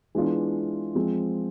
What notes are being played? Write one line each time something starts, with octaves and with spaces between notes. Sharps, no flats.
E3 G#3 B3 D4 F4
F3 G#3 C4